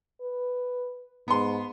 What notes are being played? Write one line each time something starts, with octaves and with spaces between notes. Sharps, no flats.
B4
G#2 B3 C6